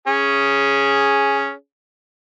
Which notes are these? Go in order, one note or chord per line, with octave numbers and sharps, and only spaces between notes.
C#4 G#4